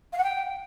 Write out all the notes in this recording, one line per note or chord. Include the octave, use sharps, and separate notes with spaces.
F5
F#5
G5